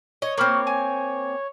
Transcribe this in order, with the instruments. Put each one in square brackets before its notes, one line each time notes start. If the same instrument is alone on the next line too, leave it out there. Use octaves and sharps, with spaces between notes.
[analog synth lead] C#5 [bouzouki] D#5
[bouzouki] A#3 C4 [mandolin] F#4 B5 F6
[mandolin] G#5